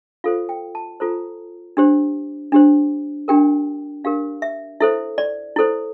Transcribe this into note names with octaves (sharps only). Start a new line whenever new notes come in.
F4 A4 C5 F5
G5
A5
F4 A4 C5 A#5
D4 G4 C5
D4 G4 C5
D4 G4 A#4 G5
D4 G4 A#4 F5
E5
E4 A4 C5 E5
D5
E4 A4 C5